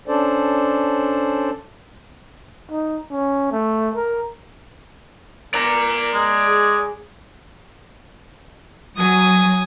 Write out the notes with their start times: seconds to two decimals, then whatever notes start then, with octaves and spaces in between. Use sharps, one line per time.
0.08 C#4 D4 A4 C5 D5
2.71 D#4
3.11 C#4
3.52 A3
3.95 A#4
5.54 A#4 D5 A#5
6.14 G#3
6.47 G#4
8.98 F#3 G#5 D#6